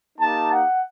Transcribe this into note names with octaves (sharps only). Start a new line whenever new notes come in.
A#3 D#4 G4 A5
F#5